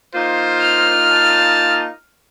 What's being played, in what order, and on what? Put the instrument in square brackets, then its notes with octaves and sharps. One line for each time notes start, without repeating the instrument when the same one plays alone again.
[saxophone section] A#3 D#4 F4 [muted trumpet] C5
[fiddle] F6
[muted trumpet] A5